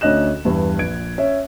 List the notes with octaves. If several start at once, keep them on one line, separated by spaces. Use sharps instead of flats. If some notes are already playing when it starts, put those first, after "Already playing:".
D2 C#4 D4 D#5 F#6 E7
E2 G2
A#1 G#6 D7
C#4 C#5 E5